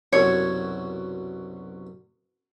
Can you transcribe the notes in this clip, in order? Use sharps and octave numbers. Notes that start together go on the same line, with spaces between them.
C2 F#2 B2 C#5